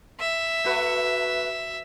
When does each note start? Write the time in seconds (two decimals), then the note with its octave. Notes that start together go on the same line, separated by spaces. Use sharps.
0.20 E5
0.64 A3 F#4 B4